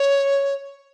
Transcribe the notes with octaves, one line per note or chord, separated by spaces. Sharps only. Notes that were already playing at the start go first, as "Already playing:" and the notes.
Already playing: C#5